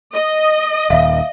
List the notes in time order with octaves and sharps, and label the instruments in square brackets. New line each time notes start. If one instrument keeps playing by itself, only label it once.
[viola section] D#5
[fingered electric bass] D#1 D#2 [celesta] E5 F5